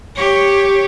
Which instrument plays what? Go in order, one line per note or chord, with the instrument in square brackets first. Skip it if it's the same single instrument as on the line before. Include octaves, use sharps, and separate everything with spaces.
[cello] G4 C#5